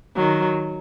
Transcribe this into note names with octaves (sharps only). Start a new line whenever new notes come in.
D#3 F#3